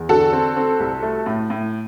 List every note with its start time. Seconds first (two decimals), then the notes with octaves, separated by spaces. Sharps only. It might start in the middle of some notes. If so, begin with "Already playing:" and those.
Already playing: E2
0.09 D3 F#4 A4
0.33 C4
0.56 C4
0.80 C2
1.03 A3
1.26 A2
1.50 A2